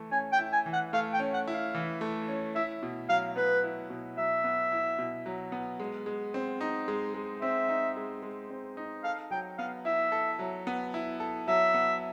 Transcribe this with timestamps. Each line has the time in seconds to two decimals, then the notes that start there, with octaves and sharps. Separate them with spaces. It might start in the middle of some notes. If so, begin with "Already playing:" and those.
Already playing: E3 A3 E4
0.11 C#4 G#5
0.32 G5
0.39 E4
0.53 G#5
0.66 E3
0.73 F#5
0.93 A3 F5
1.13 G5
1.20 C#4
1.34 F#5
1.47 E4
1.54 F5
1.75 E3
2.01 A3
2.28 C#4
2.55 E4 E5
2.83 B2
3.09 F#3 F5
3.36 B3 B4
3.63 E4
3.90 B2
4.17 F#3 E5
4.44 B3
4.72 E4
4.98 B2
5.26 F#3
5.52 B3
5.80 G#3
6.06 G#3
6.34 C4
6.61 D#4
6.88 G#3
7.14 G#3
7.41 C4 E5
7.69 D#4
7.97 G#3
8.22 G#3
8.50 C4
8.77 D#4
9.04 A4 F5
9.31 F#3 G5
9.58 B3 F5
9.85 E4 E5
10.12 A4
10.39 F#3
10.67 B3
10.94 E4
11.20 A4
11.48 F#3 E5
11.74 B3